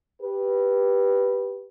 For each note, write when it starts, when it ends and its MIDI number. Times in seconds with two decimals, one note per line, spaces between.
0.22 1.68 67
0.22 1.68 71